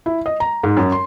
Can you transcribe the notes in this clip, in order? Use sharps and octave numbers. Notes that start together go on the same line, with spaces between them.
E4
D#5
A#5
G#2
F#2
C6